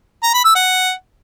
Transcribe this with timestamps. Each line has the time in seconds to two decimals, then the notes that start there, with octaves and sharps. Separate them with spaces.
0.23 A#5
0.34 B5
0.45 E6
0.55 F#5